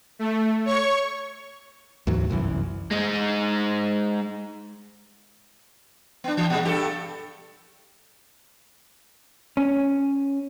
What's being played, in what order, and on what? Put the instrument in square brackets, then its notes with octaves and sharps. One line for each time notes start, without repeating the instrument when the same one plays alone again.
[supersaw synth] A3
C#5 C#6
[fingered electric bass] D2 G#2 E3 F#3
G1 C2 F#2 E3
[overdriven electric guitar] G#3 D#4
[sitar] B3 D4
E3
A#2 G#3
G2 G4 A4
[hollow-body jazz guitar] C#4